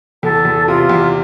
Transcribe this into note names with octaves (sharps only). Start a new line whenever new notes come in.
E2 A4
E2
C3 F4
E2